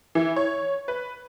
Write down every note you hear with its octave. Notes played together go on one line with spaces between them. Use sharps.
E3
C#5
B4